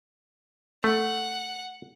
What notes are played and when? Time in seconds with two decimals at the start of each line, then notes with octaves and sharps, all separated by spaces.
0.84 A3 F#5